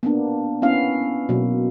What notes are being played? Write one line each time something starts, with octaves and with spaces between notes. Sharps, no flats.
A#3 B3 D4
B3 C#4 E4 F5
B2 F#3 A#3